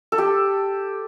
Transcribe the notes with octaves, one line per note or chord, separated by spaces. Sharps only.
A4
G4